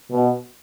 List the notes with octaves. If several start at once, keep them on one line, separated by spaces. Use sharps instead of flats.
B2